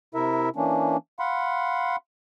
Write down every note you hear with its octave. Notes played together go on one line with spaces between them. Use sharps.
C3 E4 A#4 E5
E3 A#3 C#4 D4
F5 F#5 B5 C6